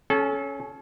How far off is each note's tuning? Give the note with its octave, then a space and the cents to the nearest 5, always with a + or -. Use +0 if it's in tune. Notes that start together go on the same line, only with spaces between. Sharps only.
C#4 +0 A4 -30